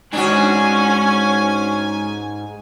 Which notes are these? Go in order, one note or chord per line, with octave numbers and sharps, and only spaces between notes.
G#2 C#4 D4 F#4 G#5